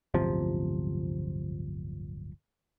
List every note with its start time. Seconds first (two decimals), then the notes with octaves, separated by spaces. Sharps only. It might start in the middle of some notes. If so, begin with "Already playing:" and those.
0.14 D1 G1 C3 F3